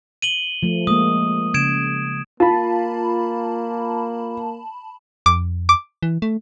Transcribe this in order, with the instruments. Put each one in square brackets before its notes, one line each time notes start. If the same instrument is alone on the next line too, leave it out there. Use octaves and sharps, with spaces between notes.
[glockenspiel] D#7 F#7 G7
[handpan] F3 A3
[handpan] G#3 A#3 [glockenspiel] D#6
[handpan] C#3 [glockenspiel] G#6 D7 E7
[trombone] A#3 [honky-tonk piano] F4 [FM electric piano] A5 B5
[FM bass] F2 [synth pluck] D6
[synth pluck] D6
[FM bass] E3
A3